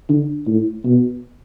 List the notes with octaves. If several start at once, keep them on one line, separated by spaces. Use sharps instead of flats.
D3
A2
B2